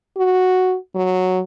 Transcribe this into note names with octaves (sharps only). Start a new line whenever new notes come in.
F#4
F#3